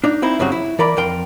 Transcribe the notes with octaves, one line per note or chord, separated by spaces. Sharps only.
D4 D#4
C4 D#4 E4 C5
G2 C#3 F#3 C4 F#4
E4
E3 A#4 D5 B5
F2 A#4 G5 C6